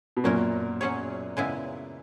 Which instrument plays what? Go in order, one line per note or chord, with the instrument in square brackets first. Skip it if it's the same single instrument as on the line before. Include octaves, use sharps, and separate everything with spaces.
[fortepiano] B2
[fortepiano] F#2 A#2 [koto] F#3 C#4 F#4 A#4
[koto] F#3 C#4 G#4 C#5
C#3 G#3 B3 E4